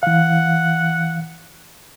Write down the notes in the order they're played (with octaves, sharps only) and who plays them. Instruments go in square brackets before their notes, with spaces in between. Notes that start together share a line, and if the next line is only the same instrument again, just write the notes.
[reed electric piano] E3 F5 [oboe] F#5